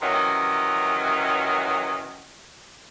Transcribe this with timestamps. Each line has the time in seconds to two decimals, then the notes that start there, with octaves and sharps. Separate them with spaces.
0.02 C3 D#3 E3 F#3 C#4